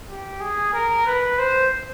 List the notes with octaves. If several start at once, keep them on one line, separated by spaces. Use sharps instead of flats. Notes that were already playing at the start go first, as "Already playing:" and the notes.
G4
G#4
A#4
B4
C5